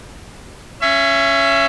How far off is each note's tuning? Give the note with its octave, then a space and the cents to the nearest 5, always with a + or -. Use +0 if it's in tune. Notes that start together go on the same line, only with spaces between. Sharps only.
C#4 +0 E5 +30